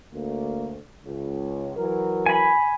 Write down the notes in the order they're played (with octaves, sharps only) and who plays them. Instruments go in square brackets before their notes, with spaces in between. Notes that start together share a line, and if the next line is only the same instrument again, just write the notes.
[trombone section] D2 A#3
C#2
E3 F#3 A#4
[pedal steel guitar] G#5 B5